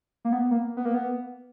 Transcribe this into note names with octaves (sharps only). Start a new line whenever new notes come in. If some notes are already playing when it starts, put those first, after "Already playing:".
A#3
B3
A#3
B3
A#3
B3